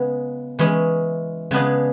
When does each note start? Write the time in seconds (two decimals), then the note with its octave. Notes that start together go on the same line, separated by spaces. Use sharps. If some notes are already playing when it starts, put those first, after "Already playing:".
Already playing: C#3 G#3 B3
0.59 E3 G#3 C#4
1.51 C#3 G#3 B3 D4 G#4